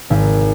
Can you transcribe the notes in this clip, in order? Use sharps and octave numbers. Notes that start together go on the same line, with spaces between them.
G#1